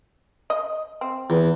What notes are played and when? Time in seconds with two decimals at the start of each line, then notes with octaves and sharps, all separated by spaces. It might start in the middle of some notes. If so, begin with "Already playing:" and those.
0.50 D#5
1.01 C4
1.30 E2